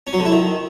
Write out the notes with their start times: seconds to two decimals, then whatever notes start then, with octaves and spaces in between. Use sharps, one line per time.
0.07 C#4
0.13 F#3
0.19 D3
0.25 E4
0.32 D#3